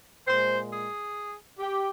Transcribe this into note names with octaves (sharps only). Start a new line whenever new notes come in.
A#2 G#3 C5
G#4
G4